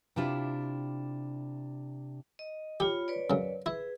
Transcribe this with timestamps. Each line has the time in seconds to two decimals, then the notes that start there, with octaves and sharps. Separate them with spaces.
0.16 C3 D4 E4 F4 G4
2.39 D#5
2.80 F4 G4 C#5 B5
3.08 B4 C#5 D5
3.30 F#2 C#3
3.66 E4 G#4 B4